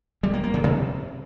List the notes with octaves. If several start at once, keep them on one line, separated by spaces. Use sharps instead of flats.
G3
A#3
A#3
C#3
C3